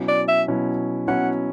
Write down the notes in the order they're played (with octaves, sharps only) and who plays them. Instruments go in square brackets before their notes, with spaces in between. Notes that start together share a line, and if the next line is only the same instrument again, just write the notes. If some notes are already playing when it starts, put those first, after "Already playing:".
Already playing: [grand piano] B2 F#3 C#4 E4
[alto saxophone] D5
E5
[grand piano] B2 F#3 C#4 E4
[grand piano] B2 F#3 C#4 E4 [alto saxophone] F#5